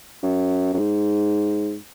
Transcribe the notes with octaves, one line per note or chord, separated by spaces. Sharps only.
F#2
F#2
G#2